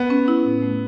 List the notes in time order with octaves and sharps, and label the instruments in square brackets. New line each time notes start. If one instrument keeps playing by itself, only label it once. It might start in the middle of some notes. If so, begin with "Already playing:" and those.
Already playing: [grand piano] B3
[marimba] C#4
E4
A2
A3